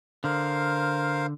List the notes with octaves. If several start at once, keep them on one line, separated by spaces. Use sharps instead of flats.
D3 A#4 C5 F5